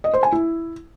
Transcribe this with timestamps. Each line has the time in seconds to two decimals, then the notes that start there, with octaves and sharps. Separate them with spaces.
0.04 D#5
0.14 C5
0.23 G#5
0.32 E4